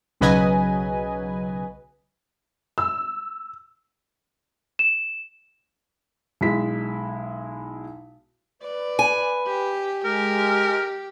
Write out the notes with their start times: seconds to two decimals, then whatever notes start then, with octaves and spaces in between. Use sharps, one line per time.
0.21 B1 C#3 F#3 B4 D#5 G#5
2.78 E6
4.79 E7
6.41 B1 G#3 E4 B6
8.63 B4 D5
8.99 G#5
9.47 G4
10.05 G#3 G4 A#4